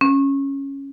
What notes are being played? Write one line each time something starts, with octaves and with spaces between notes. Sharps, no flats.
C#4